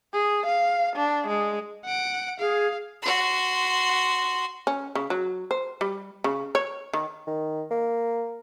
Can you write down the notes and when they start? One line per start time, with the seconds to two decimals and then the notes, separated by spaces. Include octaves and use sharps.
0.13 G#4
0.46 F5
0.96 D4
1.28 G#3
1.85 F#5 D7
2.40 G#4 F5
3.02 F#4 C6
4.67 C#4
4.95 C#3
5.10 F#3
5.51 C5
5.81 G3
6.24 C#3
6.55 C#5
6.93 D#3
7.27 D#3
7.71 A#3